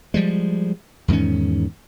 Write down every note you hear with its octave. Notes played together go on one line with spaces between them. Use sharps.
F3 G3 G#3
E2 G#2 D#3 C#4